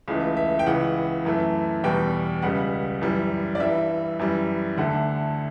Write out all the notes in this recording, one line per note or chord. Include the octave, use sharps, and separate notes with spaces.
C#2 C#3 E3 A3
E5
G5
C#2 C#3 E3 F#5
F#2 E3 A3
E2 B2 G3 G5
C#2 C#3 G3 F#5
F#2 E3 G3
D5
G2 E3 G3 E5
F#2 E3 G3
D2 D3 A3 F#5